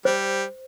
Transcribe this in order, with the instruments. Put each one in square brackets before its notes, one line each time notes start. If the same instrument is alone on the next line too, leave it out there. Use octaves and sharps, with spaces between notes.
[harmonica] G3 [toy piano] C5